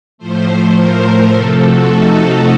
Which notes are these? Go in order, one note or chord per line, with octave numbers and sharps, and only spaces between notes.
A2 F3 A3 C5
A#4
C3 F3 A3 A4
F#4
D#4